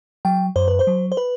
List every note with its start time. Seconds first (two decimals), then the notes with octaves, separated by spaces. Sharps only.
0.25 F#3 G5
0.56 F#2 C5
0.68 B4
0.79 C5
0.87 F#3
1.12 C5
1.17 B4